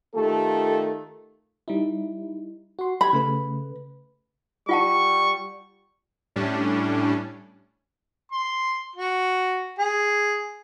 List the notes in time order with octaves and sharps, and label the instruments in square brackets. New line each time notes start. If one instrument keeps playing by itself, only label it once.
[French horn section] D#3 A3 F4 G4 A4
[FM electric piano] G3 D#4 E4
F#4 C6
[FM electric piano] G4 G#6 [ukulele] B5
[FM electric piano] C#3 A3 B4
[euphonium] G3 [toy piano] F4 F#5 A5 [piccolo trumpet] C#6
[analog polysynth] A2 G3 C#4 D4
[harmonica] C6
F#4
G#4